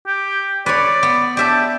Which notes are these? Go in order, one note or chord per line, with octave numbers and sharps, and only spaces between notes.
G4
B4 C#5 D5
B3
G4 D5 E5 A5